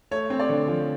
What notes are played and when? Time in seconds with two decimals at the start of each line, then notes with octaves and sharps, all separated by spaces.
0.11 A3 C#5
0.30 C4
0.39 D5
0.49 D3
0.68 F3